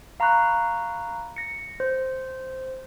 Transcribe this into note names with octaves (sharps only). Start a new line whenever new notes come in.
F5 A#5 B5 C#6 F#6
A#6 C#7
C5